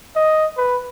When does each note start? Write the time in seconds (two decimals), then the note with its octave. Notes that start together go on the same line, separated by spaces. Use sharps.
0.16 D#5
0.57 B4